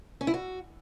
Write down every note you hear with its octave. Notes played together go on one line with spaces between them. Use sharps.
C#4
E4
F#4